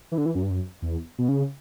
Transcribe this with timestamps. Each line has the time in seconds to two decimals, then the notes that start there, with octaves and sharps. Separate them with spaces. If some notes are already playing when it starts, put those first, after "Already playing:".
0.12 E3
0.18 D3
0.26 E3
0.35 F#2
0.43 G2
0.50 F#2
0.82 E2
1.18 B2
1.29 C#3